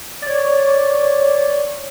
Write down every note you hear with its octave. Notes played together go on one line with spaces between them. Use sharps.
C#5 D5